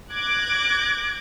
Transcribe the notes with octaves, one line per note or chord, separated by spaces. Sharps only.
D6 F#6 G#6 A#6 D7